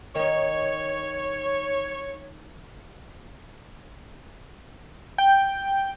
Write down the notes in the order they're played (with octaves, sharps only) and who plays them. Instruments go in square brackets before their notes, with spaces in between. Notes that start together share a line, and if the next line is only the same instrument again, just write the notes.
[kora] D#3 D#4 [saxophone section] C#5
[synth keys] G5